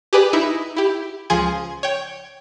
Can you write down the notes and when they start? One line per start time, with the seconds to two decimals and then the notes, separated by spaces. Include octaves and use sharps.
0.13 G4 G#4 B4 D5
0.33 D#4 E4 E5
0.76 E4 G4
1.30 C#2 F3 G#4 G#5 C6
1.83 C#5 G5